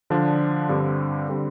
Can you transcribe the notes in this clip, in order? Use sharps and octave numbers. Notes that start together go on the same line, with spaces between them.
D3 F3 D4 F4
G2 D3 G3 C4
D3 G3 C4